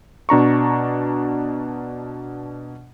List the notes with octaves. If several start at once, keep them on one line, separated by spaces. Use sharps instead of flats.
B2 D4 A#5 C#6